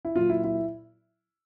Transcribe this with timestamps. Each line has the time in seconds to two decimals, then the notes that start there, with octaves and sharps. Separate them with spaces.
0.05 E4
0.15 A#2 F#3 F4
0.30 E4
0.44 E4